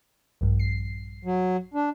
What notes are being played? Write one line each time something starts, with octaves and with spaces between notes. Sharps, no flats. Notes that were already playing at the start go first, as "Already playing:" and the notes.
A#1 G2
C7
F#3
D4